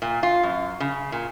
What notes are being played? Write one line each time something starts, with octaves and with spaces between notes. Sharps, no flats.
A#2
F4
F#2
C#3
A#2